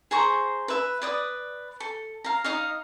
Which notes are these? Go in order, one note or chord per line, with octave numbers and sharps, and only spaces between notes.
G#4 C5 A#5 C#6
B4 E5
B4 D5 D#6
A4
F5 A#5
D#4 D#5 F5